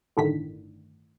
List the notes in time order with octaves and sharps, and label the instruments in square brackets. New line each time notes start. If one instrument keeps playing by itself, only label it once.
[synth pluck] G1 A2 D3 D#3 B6